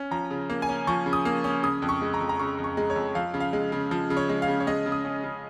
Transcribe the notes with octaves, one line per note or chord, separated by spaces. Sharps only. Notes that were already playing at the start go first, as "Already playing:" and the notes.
Already playing: C#4
F3 A#5
C#3
A#3
G#5
C#4
F3 C#6
C#3
D#6
A#3
C#4
C#3 D#6
F2
C#6
G#3
A#5
F2
A#5
C#3 C#6
F2
C#6
G#3
C#5
F2
F3 F5
C#3
F5
G#3
C#3
F3
C#3
C#5
G#3
F5
C#3
C#5
G#3 D#5
C#3
D#6
C#4
C#3